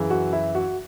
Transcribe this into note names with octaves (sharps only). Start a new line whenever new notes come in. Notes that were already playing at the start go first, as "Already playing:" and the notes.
Already playing: F#2 C#3 E3
F#4
E4
F#4